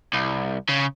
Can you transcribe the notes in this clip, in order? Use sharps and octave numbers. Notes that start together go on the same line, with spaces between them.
C2
C#3